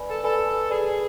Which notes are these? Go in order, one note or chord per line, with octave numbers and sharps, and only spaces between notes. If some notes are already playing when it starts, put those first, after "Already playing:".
Already playing: B4 D5 G#5 B5
A4
A4 B4 D5 G#5 B5
G#4 B4 D5 G#5 B5